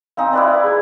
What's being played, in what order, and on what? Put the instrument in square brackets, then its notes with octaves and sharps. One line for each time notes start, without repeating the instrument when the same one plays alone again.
[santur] C4 D#4 [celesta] F5 G#5
[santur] E4 B4 D5
[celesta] G#4 G#6